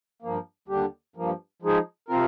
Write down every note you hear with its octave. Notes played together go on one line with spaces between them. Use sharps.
G2 F3 A#3
D#2 D3 G3 D4 G4
G2 F3 A#3
F3 G#3 D#4 G#4
C3 F3 C4 F4 A#4